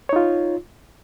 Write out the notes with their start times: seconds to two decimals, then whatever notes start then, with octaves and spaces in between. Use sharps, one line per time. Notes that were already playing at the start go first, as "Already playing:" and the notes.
0.09 C#5
0.13 D#4
0.16 F4